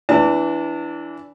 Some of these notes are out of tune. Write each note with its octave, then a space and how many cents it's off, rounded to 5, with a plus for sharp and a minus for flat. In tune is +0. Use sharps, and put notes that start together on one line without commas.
E3 +5 D4 -20 A5 +40